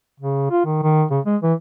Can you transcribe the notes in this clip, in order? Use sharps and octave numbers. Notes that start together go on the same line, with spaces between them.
C#3
F4
D#3
D#3
C#3
G#3
E3